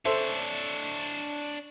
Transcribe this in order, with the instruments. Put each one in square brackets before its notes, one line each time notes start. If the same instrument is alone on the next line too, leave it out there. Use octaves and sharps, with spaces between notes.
[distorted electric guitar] D4 C#5 [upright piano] A4 C5 E5